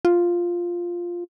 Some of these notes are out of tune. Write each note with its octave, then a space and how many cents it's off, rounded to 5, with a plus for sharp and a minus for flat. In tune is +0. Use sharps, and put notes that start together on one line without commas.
F4 +0